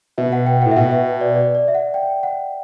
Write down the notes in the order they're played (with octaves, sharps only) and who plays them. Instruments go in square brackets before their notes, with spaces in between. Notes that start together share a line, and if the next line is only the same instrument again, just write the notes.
[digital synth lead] B2 [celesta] E5
[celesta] F#5
G5
[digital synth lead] A2 [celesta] F#5
[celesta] E5
[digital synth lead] B2 [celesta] F#5
[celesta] E5
D5
D5
D5
E5
F#5
G5
F#5